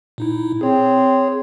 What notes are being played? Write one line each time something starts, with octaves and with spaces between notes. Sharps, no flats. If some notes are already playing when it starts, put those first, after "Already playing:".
A#2 D#4 E4
C4 G#4 C#5